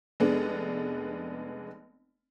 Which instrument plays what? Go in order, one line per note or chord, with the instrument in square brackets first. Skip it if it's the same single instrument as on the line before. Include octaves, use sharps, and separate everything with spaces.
[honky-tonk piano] F1 G#3 B3 D4